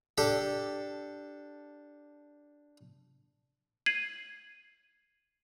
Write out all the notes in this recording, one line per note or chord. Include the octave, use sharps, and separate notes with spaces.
D4 G4 A4
G#6 C7 D#7 F#7